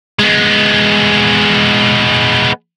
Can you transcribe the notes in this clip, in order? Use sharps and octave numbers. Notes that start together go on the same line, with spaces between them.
G#3 B3